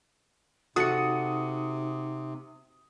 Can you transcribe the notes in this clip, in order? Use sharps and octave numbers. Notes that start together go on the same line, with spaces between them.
C3 D#4 F#4 A4 D#6 C#7